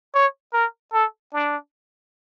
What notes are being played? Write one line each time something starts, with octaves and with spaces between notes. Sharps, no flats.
C#5
A#4
A4
D4